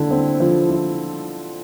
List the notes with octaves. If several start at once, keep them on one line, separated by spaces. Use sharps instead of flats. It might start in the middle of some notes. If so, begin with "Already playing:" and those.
Already playing: D3 E4
C4
F3
E4